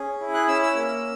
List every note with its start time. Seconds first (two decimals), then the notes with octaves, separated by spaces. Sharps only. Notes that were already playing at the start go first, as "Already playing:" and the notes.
Already playing: C#4 G#4
0.21 E4
0.34 F#6
0.48 C#4 E6
0.62 E6
0.76 A#3